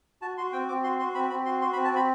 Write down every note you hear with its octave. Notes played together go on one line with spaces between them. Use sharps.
F#4 A5
F#4 C6
C4 G5
C4 D6
F#4 C6
F#4 C6
C4 B5
C4 B5
F#4 C6
F#4 C6
B5
C4
A5
C4 B5